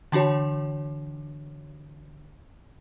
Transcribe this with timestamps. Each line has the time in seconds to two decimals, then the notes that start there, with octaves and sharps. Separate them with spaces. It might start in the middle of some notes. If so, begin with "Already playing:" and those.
0.12 D3 E3 D4 F#4 C#5